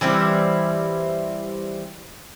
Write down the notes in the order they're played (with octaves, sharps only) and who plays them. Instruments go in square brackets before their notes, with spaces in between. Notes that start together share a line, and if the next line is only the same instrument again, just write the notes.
[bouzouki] E3 G3 C4 E4